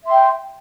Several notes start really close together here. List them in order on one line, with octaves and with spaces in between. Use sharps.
E5 C6 G5